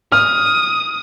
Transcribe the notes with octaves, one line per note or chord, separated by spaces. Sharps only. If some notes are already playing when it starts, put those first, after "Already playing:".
D#6 F6